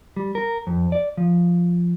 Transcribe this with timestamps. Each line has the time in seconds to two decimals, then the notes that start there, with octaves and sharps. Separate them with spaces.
0.17 G3
0.35 A#4
0.67 F2
0.92 D5
1.17 F3